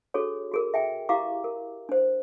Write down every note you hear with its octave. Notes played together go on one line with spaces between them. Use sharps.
D4 F#4 G#4 A4 C#5
F#4 G#4 A#4
E5 G5 G#5
E4 G4 F5 A#5 D6
A#4
D4 C5